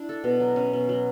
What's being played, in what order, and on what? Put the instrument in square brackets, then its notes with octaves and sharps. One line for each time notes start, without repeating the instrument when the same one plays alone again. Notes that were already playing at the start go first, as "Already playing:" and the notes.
Already playing: [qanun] D4 E4
A4
B2
F#3
C#4
B2
F#3